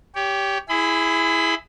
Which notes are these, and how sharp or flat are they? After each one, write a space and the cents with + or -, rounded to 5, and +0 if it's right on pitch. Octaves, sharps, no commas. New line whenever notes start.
G4 +0 C#5 +30
E4 -5 G#4 +0 B5 +35